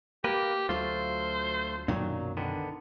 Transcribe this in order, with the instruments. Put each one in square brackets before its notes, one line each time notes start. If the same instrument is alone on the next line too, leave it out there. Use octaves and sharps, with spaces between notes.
[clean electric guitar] A#3 A#4 B4 [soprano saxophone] G4
[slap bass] D2 F#3 [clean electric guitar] A3 F4 [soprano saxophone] C5
[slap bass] B1 F#2 D4 [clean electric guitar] A#2 D#3 F#3
[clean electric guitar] D3 D#3 B3